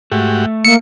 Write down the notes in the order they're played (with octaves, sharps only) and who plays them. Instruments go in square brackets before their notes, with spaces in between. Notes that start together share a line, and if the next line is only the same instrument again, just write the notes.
[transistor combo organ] G#2 F#4 G4 [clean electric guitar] A3
[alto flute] A#3 [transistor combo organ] E5 [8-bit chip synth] C#7